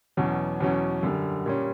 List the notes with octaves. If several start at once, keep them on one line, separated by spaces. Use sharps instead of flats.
E2 B2 F#3 C#4
E2 B2 F#3 C#4
F#2 D3 G3
A#2 G3 C#4